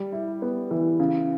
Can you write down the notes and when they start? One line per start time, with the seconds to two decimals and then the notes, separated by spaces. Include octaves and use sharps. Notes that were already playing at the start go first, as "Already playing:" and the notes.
Already playing: G3
0.12 E4
0.42 B3
0.71 E3
1.00 C#3